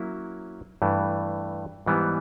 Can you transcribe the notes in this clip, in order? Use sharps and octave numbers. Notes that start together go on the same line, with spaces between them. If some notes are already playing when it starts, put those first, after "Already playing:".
Already playing: F#3 A#3 C#4 E4
G2 E3 A3
G#2 E3 G3 B3